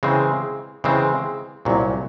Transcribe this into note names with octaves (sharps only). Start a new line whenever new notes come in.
C#3 E3 G#3 C4
C#3 E3 G#3 C4
C2 A#2 F#3